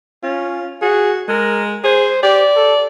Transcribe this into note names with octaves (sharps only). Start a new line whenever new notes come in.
C#4 F4
F#4 G#4
G#3 A#4
G#4 C5
G4 D5
A4